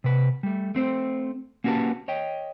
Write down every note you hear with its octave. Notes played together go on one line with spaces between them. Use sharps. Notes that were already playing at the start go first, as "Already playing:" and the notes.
C3 B4
G3 A3
A3 C4 C5
A#3 C#4 F#4 G4 B4 A5
C#5 D#5 G5